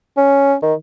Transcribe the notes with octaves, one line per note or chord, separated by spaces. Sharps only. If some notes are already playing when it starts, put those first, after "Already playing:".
C#4
D#3